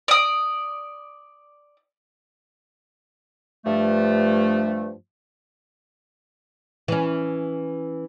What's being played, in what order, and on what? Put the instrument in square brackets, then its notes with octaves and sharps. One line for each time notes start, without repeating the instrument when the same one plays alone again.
[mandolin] D5 D#6
[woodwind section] G2 F3 A3
[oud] E3 C#4